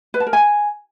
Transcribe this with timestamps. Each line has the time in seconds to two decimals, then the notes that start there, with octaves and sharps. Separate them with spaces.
0.14 B4
0.20 A5
0.27 A#4
0.33 G#5